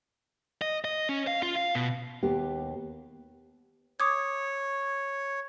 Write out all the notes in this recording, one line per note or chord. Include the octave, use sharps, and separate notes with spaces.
D#5
D#5
C#4
F5
F4
F5
B2
D#2 B3 G4
C#5 D6 D#6 G#6